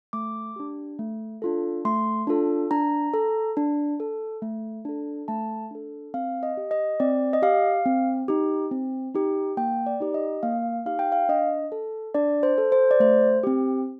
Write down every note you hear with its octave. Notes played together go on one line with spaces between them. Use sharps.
A3 D6
D4 G4
A3
D4 F4 A4
A3 C6
D4 F4 A4
D4 A#5
A4
D4
A4
A3
D4 A4
A3 A5
D4 A4
C4 F5
D#5
G4
D#5
C4 D5
D#5
G4 F5
C4
D#4 G4
C4
D#4 G4
A#3 G5
D5
D#4 G4
D#5
A#3 F5
D#4 G4 F5
G5
F5
D4 D#5
A4
D4 D5
C5
A4
C5
D5
A3 C5
C4 G4